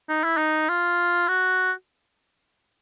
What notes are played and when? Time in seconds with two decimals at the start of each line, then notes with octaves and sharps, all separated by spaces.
0.09 D#4
0.24 E4
0.37 D#4
0.69 F4
1.28 F#4